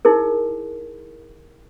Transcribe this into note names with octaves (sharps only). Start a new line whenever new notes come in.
D#4 E4 G#4 A#4